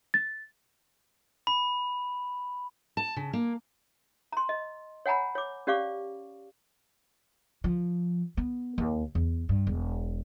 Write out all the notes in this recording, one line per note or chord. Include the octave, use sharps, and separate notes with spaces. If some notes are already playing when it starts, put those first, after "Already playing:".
A6
B5
A5
C#3
A#3
A#5 C6
D#5
C#5 F#5 G#5 A#5 B5
C#5 D6
C#4 G4 D5 F5 C#6 D6
F3
B3
D#2
E2
G2
E1